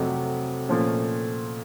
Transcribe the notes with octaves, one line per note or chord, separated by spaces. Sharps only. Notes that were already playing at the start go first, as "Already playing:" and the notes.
Already playing: F2 C3 F#3 A3
A#2 F3 A3 C#4